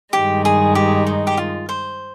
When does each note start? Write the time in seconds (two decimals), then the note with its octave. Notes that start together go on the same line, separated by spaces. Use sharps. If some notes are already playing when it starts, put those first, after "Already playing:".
0.13 G2 D#3 G#3 G4
0.45 G#4
0.75 G4
1.07 D#4
1.27 G4
1.37 F4
1.69 C5